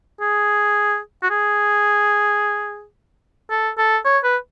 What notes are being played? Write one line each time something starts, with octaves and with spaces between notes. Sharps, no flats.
G#4
F#4
G#4
A4
A4
C#5
B4